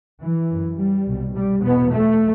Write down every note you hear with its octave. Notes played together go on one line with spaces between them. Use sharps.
E3
F#2
G3
C2 B2
G3
E2 B2 B3
A3